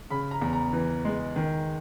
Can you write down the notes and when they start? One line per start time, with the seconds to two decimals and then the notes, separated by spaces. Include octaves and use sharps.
0.10 C#3 B5
0.31 A#5
0.42 E2
0.53 A#5
0.73 E3
1.05 G#3
1.36 D#3